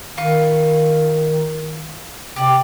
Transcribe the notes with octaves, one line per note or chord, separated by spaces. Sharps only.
D#3 F4 B4 C#6
C3 G4 D5